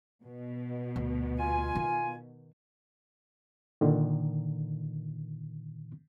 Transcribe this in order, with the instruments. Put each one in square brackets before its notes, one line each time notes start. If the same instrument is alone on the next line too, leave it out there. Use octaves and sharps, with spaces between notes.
[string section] B2
[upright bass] D2
[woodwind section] F4 G#5
[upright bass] D#3
[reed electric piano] A#2 D3 D#3